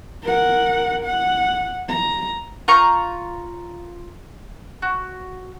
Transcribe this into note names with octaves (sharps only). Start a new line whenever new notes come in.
A#4 F#5
F#5
A#5
F4 A#5 C#6 G6
F#4